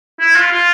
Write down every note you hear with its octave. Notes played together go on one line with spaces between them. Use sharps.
E4
F4
F4